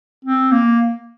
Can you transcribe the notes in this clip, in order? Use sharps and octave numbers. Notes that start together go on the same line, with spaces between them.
C4
A#3